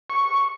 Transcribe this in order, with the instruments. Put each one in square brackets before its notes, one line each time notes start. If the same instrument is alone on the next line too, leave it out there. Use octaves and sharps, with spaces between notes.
[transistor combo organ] C#6